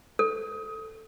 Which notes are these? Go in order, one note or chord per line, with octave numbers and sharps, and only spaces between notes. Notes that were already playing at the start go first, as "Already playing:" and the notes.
A4